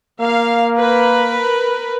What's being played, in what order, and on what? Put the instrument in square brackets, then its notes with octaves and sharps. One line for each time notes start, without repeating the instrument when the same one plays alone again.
[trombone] A#3 [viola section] F5
[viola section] A#4 B4